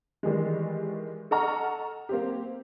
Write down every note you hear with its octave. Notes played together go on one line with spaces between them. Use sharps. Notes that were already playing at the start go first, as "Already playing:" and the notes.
D#3 E3 G3 G#3
A4 D#5 F#5 A#5 C#6 F6
A#3 C4 G4